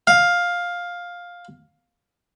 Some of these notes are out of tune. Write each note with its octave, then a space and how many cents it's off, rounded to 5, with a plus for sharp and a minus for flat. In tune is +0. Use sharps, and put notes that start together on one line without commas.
F5 +10